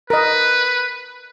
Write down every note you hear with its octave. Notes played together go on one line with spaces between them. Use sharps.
A#4 B4 D#5